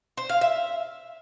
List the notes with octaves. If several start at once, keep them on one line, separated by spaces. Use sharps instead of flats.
C5
F5
E5